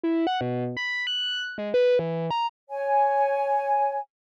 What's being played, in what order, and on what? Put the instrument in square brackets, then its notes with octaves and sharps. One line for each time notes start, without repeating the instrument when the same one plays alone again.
[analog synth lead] E4
F#5
B2
B5
F#6
G#3
B4
E3
A#5
[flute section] C#5 G#5